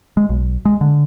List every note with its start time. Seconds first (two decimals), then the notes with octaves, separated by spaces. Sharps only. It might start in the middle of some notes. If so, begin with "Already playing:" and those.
0.17 G#3
0.29 B1
0.65 G#3
0.81 D3